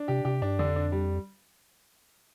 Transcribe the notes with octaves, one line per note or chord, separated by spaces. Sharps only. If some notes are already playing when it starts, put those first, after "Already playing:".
Already playing: D4
C3 G4
C3 G4
G2 D4
F2 D3
D4
G3